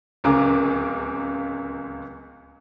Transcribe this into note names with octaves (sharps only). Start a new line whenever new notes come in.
D1 C#2 C#3 A#4 D6